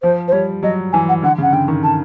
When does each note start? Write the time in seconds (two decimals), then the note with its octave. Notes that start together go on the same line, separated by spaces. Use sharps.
0.02 F3 C5
0.28 C5
0.32 G3 C#5
0.63 F#3 D#5
0.93 E3 G#5
1.09 F#5
1.23 D3 F#5
1.38 C#3
1.42 F#5
1.53 D3 G5
1.68 D#3
1.83 A5